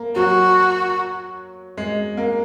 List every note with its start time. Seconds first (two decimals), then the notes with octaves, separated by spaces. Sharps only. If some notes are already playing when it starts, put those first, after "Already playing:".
Already playing: A#3
0.15 F#3 F#4
1.77 G#3
2.17 A#3